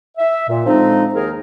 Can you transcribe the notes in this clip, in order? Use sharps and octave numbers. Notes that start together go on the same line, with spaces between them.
E5
A#2
D3 F3 G#3 C4 D#4
D#2 G#4 A#4